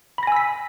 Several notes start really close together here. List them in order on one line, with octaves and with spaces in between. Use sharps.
B5 A#6 G#5 E6 B6